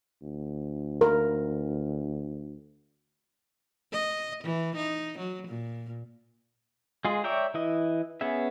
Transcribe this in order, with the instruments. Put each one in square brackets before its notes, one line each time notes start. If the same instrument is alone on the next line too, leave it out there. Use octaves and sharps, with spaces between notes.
[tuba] D2
[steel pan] A#4
[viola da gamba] D#5
E3
D#4
F#3
A#2
[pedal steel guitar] G#3 F4 G#4
C#5 D5 E5 G5 A#5
E3 E4 D#5
B3 C#4 G#4 E5